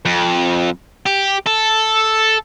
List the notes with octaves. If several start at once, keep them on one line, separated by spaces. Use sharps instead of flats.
F2
G4
A4